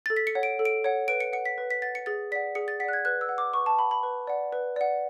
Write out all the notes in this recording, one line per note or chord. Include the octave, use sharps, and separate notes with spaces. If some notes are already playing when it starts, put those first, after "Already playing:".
A4 A6
B6
C#7
C#5 F#5
D7
A4
D7
C#5 F#5
B4 D7
C#7
F#5 C#7
B6
B4
B6
F#5 A6
C#7
G#4 A6
D5 F#5 B6
G#4 C#7
A6
D5 F#5 F#6 B6
G#6
B4 F#6
E6
F#5
D6
B4 C#6
A5
F#5 B5
B5
B4
D5 F#5
B4
D5 F#5